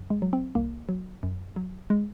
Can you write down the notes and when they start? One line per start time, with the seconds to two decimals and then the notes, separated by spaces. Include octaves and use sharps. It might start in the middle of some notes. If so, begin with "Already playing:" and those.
Already playing: F#2
0.10 G#3
0.22 F#3
0.33 C4
0.55 C2 A#3
0.89 F#3
1.23 F#2
1.56 F#3
1.90 G#3